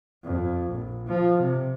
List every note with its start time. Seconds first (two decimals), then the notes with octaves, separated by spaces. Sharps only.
0.24 F2
0.71 A#1
1.07 F3
1.41 C3